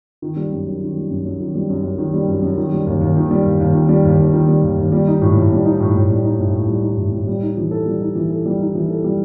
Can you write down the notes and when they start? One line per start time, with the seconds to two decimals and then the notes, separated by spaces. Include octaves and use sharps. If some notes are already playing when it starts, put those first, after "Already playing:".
0.22 D#3
0.37 G3
0.52 F#2
0.66 F#2
0.81 D#3
0.96 G3
1.10 F#2
1.25 F#2
1.40 D#3
1.55 G3
1.70 F#2
1.83 F#2
1.98 D#3
2.14 G3
2.28 F#2
2.42 F#2
2.58 D#3
2.72 G3
2.87 D#2
3.01 D#2
3.16 D#3
3.31 G3
3.46 D#2
3.60 D#2
3.75 D#3
3.89 G3
4.05 D#2
4.18 D#2
4.33 D#3
4.48 G3
4.62 D#2
4.77 D#2
4.92 G3
5.08 D#4
5.22 A2
5.36 A2
5.52 G3
5.65 D#4
5.80 A2
5.95 A2
6.11 G3
6.25 D#4
6.39 A2
6.53 A2
6.68 G3
6.84 D#4
6.97 A2
7.12 A2
7.27 G3
7.43 D#4
7.57 E3
7.71 A4
7.86 G3
8.01 D#4
8.15 E3
8.30 A4
8.46 G3
8.60 D#4
8.75 E3
8.90 A4
9.04 G3